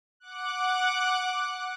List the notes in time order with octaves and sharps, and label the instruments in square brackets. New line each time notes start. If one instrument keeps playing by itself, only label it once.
[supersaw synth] F#5 D6 F#6